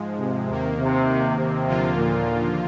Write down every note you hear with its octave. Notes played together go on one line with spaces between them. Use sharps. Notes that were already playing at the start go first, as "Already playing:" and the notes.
Already playing: G#2 F3 G#3
C3
D#2 D#3 A#3
C3
C3
D#2 D3 F3 A#3 F4
A#2